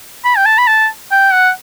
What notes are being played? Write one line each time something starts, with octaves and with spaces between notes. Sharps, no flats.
B5
G5
A5
B5
A5
G5
F#5